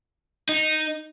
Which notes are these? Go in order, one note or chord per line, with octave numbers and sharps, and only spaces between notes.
D#4